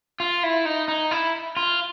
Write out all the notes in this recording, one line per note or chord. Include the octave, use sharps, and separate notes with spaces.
F4
E4
D#4
D#4
E4
F4